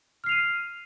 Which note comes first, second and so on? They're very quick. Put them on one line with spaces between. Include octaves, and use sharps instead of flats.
F6 C7 F7 D#7